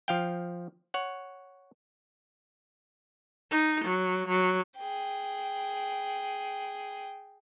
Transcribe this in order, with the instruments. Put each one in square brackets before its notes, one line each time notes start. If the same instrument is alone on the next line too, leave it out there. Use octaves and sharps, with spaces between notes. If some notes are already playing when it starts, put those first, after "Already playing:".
[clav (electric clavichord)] F3 F5 G5
C#5 F#5
[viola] D#4
F#3
F#3
[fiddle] G#4 G5